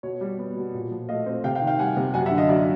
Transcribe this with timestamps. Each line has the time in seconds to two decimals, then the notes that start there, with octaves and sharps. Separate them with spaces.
0.03 B2 C#5
0.21 G3
0.39 B3
0.56 B2
0.74 A#2
0.91 F3
1.09 A3 D#5 F5
1.26 C4
1.44 C3 F5 G5
1.55 F5 G5
1.61 D#3
1.67 F5 G5
1.79 G3 F#5 G#5
1.97 C3
2.14 F#2 F#5 G#5
2.26 E5 F#5
2.31 D3
2.38 D#5 F5
2.49 F#3 D5 E5